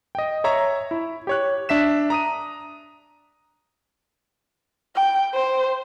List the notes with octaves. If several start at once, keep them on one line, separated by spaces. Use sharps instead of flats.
D#5 G5
C#5 E5 A#5 C#6
E4
G4 C#5 F#6
D4 E5 B6 E7
A#5 D#6 D#7
G5
C5